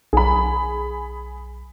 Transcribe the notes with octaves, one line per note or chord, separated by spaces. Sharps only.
B1 G#4 B5